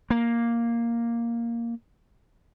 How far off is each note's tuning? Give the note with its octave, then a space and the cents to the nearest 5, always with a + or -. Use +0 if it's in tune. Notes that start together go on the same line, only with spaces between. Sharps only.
A#3 +0